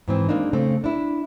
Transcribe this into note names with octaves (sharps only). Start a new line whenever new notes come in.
G#2 E3 C4
G#3 A#3 C4 D4 D#4
C#3 A3 C4
D4 E4